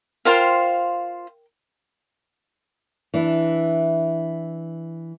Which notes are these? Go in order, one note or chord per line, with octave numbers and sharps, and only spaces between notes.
F4 A#4 C5 F5 G5
E3 D4 E4